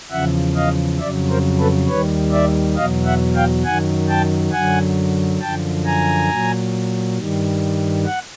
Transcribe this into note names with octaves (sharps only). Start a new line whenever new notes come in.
E2 C#3 F3 E5 F#5
D#5 F5
F2 C#3 F#3 D5 E5
A#4 C5
A4 B4
D#2 D#3 G3 B4 C#5
D5 E5
E2 B2 F#3 D#5 F5
E5 F#5
F5 G5
F#2 D#3 F#3 F#5 G#5
G5 A5
F#2 D3 F#3 F#5 G#5
F#2 D3 F3 G5 A5
G#5 A#5
A#2 F#3
G2 D#3 G3
F#5